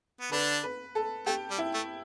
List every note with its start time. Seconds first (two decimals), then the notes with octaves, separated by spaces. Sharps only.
0.21 B3
0.31 D3 D4 B4
0.63 B4
0.95 A4
1.26 A3 G4
1.50 G3
1.58 E4
1.74 A3